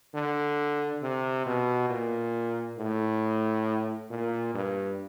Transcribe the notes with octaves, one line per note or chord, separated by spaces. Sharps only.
D3
C3
B2
A#2
A2
A#2
G2